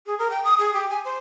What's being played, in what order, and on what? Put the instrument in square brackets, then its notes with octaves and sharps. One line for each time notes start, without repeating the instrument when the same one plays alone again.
[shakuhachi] G#4
A#4
G5
D#6
G#4
G4
G#5
C5